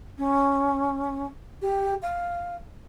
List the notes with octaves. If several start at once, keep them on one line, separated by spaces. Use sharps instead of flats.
C#4
G4
F5